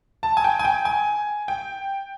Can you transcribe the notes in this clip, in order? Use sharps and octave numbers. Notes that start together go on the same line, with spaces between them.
A5
G#5
G5
G#5
G5
G#5
G5